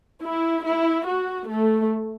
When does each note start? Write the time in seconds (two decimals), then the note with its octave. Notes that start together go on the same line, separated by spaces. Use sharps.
0.21 E4
0.64 E4
1.06 F#4
1.48 A3